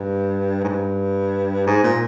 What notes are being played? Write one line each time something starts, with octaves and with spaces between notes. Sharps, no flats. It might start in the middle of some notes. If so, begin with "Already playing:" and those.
Already playing: G2
G#2
G2
G#2
A#2